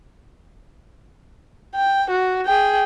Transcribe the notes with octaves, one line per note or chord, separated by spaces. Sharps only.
G5
F#4
G#4 G5